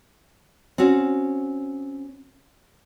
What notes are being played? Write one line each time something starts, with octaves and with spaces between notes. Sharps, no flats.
C4 C#4 F#4